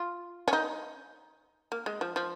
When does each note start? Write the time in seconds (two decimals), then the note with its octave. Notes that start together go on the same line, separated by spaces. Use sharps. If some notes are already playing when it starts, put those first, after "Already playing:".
Already playing: F4
0.48 C#4
0.53 D#4
1.72 A#3
1.86 G#3
2.01 F3
2.16 F3